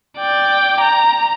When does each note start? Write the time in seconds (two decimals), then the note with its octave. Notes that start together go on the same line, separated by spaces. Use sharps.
0.18 D5 G5
0.81 A#5